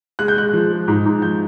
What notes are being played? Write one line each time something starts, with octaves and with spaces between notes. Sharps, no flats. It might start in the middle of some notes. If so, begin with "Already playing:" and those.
G#3 F#6
G6
G#3 F#6
F3
G#3
G#2
G#2
F3 G6